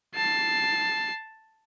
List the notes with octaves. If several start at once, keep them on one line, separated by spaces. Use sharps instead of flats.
A5 C7